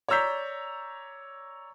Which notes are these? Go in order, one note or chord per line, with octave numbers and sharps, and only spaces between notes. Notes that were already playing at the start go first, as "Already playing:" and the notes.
C#5 D5 A#5 E6 G6 B6